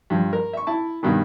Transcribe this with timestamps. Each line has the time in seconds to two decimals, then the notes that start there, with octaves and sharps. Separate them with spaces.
0.10 G2 F3
0.33 A#4
0.53 E5 C#6
0.67 E4 A5
1.03 G2 B2 D#3